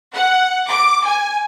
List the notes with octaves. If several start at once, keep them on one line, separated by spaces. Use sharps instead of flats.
F#5
D6
G#5